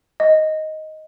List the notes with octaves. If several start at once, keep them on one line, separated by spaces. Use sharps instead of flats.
D#5